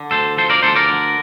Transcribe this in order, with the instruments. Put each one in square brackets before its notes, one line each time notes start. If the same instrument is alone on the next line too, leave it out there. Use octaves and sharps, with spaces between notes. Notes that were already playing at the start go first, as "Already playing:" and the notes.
Already playing: [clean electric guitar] D3
D2 A4 C5
F3 A4 C5
A#4 D5
D2 A4 C5
A#4 D5
D3